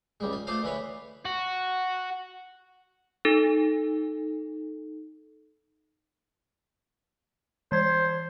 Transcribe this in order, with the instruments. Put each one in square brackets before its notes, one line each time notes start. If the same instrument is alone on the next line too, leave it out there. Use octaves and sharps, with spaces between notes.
[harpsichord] C#2 G3 G#3
F4
A3 F4 C5 D5 D#5 F5
D3 E3 B4 C#5
[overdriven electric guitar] F#4
[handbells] D#4 A4
[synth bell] E3 G#6 [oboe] C5